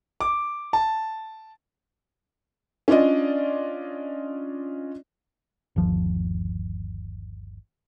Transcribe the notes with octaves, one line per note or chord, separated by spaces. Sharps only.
D6
A5
C#4 D4 F4 D5 D#5
G1 D#2 F3